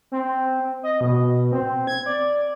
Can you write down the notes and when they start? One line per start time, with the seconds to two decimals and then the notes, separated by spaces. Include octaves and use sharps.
0.12 C4
0.83 D#5
1.01 B2
1.52 C4
1.87 G#6
2.06 D5